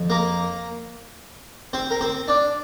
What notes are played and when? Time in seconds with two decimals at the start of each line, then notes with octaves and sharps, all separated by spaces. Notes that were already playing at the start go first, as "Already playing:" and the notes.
Already playing: F2 F3
0.10 A#3 A#4
1.73 C4 C5
1.91 A#4
2.01 C4 C5
2.28 D4 D5